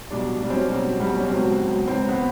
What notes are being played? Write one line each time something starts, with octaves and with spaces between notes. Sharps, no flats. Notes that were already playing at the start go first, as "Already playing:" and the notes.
B1 B2 G3 D4
B1 B2 G3 D4
C4
C#4
B1 B2 G3
B1 B2 G3
C#4
C#2 B2 F#3 C4
C#2 B2 F#3
C#2 B2 F#3 C4
B3